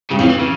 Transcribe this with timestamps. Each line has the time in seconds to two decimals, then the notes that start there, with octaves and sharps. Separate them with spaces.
0.11 G2 C#3
0.19 F2 E3
0.30 E3
0.39 C#3